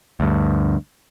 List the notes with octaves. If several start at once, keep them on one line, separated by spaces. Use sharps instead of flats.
D2 G2